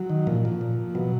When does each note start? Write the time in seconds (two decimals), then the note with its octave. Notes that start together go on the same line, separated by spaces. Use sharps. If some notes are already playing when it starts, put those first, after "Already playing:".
Already playing: F#3
0.10 D#3
0.27 A#2 F3
0.45 F3
0.61 A#2
0.95 B2 F#3